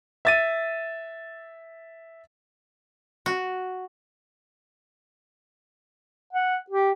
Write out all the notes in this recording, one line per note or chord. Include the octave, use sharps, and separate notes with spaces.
E5 A6 D#7
F#4
F#5
G4